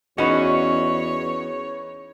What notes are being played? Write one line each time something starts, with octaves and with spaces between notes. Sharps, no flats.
E2 C#4 D#4 F#4 B4 C#5